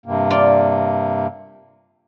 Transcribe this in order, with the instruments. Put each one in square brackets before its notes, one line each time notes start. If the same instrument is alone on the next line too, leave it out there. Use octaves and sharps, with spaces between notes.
[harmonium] G2 C3 A#3
[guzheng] F4 D5